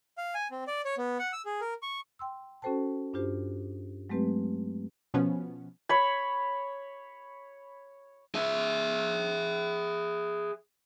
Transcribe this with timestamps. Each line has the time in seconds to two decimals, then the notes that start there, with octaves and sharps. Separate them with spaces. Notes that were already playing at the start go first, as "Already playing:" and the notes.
0.18 F5
0.34 G#5
0.51 C4
0.67 D5
0.85 C#5
0.98 B3
1.19 F#5
1.33 E6
1.45 G#4
1.61 A#4
1.83 C#6
2.19 G5 C6 E6
2.62 C#4 F#4 A4 C5 G5 A5
3.13 G2 D4 F4 G4 C5
4.10 F#3 G#3 A3 C4 G4 B4
5.14 B2 F3 B3 C#4
5.89 C#5 B5
8.35 G#4 E5